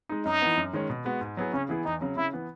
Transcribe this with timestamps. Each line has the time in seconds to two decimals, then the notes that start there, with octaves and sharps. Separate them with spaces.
0.09 G#3 D#4
0.25 F#2 D#4
0.41 E3 B3
0.57 F#2
0.73 D#3 G#3 C#4
0.90 B2
1.05 G#3 B3 F#4
1.21 G#2
1.37 F#3 B3 E4 G#4
1.53 C#3 C#4
1.69 E3 B3 E4 G#4
1.85 E2 D#4
2.01 C#3 F#3
2.17 C#3 E4
2.33 E3 B3